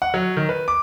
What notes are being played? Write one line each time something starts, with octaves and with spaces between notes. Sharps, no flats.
F#5
F#3
D#3
B4
D6